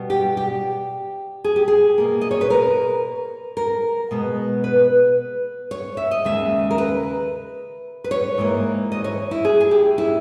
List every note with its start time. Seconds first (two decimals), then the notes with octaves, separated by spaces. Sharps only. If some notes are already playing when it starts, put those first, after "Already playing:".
Already playing: B2 G3 B3
0.10 G4
0.37 G4
1.44 G#4
1.56 G4
1.68 G#4
1.98 B2 A#3
2.21 D#5
2.31 C#5
2.41 B4
2.50 A#4
3.57 A#4
4.11 B2 G#3 B3
4.64 B4
5.71 C#5
5.97 E5
6.11 D#5
6.24 D#2 C#3 G#3 E5
6.71 A#4
6.78 B4
8.04 B4
8.11 C#5
8.38 G#2 E3 A#3
8.92 D#5
9.04 C#5
9.31 E4
9.45 G#4
9.61 G#4
9.71 G4
9.98 E4